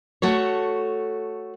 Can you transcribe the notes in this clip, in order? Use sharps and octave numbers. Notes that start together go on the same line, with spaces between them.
A3 F#4 A4 C#5